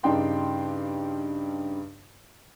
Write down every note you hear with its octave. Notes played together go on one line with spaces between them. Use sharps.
G2 C#3 D4 D#4 G5 C6